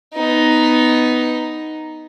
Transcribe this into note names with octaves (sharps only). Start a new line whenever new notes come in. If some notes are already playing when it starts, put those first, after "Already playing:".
B3 D#4